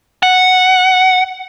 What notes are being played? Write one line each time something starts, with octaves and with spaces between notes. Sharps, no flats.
F#5